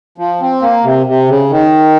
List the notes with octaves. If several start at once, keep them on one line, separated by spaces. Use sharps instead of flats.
F3
C4
A#3
C3
C3
C#3
D#3